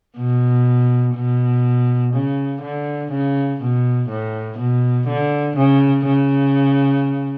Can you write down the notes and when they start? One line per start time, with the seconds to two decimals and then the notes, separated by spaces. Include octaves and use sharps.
0.17 B2
1.15 B2
2.13 C#3
2.62 D3
3.12 C#3
3.61 B2
4.09 A2
4.58 B2
5.08 D3
5.56 C#3
6.06 C#3